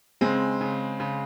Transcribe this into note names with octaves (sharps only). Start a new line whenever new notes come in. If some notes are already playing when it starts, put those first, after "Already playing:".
C#3 G#3 C4
C#3
C#3